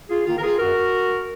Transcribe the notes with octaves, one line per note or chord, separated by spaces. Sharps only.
F4 G#4
D#3 A#3 F4
A#4
F4 G#4
F#2 F#4 A#4